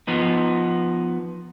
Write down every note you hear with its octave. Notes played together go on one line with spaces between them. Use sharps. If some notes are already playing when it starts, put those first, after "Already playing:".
F3 B3 D#4